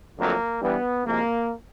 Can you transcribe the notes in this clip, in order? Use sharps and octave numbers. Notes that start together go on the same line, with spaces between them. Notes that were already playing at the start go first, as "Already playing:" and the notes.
F2 D3 F#3 A3 A#3
G2 E3 G3 B3
C2 C3 F3 G#3 A#3